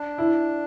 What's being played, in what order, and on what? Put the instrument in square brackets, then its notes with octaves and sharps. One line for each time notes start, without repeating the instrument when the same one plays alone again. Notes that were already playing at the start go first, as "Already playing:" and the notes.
Already playing: [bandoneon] D4
[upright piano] E4